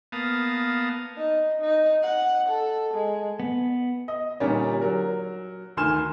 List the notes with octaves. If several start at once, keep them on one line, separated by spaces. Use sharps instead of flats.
A#3 B3 F5 A5 D#6
D#4
D#4
F#5
A4
G#3
B3
D#5
A#2 D3 G3 C#4 D#4
F#3 A#4
D2 D#3 G#5 C6 F6 E7